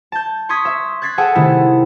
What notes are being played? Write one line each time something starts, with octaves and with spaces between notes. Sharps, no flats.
A5 G6
C6 C#6 D#6 G#6 B6
E5
F#6 G#6 A6 B6 C7
G#4 A4 F#5 G5 A5
C3 D#3 A3 E4